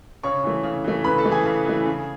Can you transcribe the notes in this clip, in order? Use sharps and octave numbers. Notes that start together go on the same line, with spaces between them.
C#3 C#5 C#6
E3 A3
C#3
E3 A3
C#3 B4 B5
A4 A5
E3 A3
G#4 G#5
C#3
E3 A3
C#3